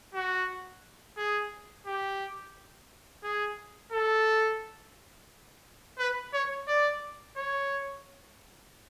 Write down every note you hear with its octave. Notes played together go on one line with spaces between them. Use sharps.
F#4
G#4
G4
G#4
A4
B4
C#5
D5
C#5